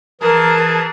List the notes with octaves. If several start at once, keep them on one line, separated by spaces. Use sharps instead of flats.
E3 G#4 A#4 A5